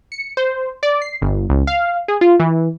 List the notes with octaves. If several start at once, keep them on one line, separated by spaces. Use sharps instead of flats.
C#7
C5
D5
C7
G1
C#2
F5
G#4
F4
E3